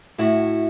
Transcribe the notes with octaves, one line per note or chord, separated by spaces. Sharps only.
A2 E4 F#4